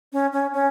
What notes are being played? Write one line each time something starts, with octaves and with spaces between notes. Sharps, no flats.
C#4
C#4
C#4